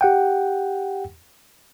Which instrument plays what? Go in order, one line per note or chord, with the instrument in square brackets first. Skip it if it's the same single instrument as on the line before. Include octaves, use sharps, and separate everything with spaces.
[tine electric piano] G4 F#5 G5